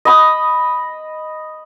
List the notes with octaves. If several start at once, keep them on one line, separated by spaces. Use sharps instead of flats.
D#5 B5 D#6